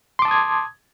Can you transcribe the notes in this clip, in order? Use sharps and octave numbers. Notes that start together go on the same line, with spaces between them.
A5 C6 D6 D#6 G#6